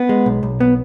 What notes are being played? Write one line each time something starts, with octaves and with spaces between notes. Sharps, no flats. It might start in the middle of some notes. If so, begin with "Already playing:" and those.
Already playing: B3
G#3
B1
B1
B3